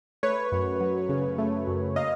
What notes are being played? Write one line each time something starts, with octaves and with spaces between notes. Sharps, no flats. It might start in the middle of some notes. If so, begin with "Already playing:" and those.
A3 B4 C#5
F#2
F#3
C#3
A3
F#2
A#3 D#5 F5